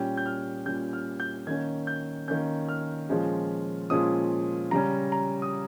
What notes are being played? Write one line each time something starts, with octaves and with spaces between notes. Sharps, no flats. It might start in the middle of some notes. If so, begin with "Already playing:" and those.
Already playing: A#2 G3 C#4 G5
G6
F6
A#2 G3 C#4 G6
F6
G6
D#3 A#3 C#4 G#6
G6
D#3 A#3 C#4 G6
F6
A#2 F3 G#3 C#4
A#2 F3 G#3 C#4 D#6
C#3 G3 C#4 A#5
A#5
D#6